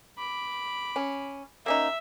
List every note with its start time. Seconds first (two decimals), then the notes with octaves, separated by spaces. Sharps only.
0.18 B5 D6
0.96 C#4
1.66 A#3 C#4 D#4 E5